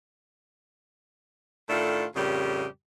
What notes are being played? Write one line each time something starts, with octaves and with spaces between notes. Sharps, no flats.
A2 D#3 A3 D4 F4 A4
F2 A2 C#3 G3 G4 A#4